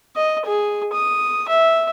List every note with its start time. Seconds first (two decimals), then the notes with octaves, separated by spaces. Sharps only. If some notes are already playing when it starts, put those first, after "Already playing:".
0.16 D#5
0.46 G#4
0.93 D#6
1.49 E5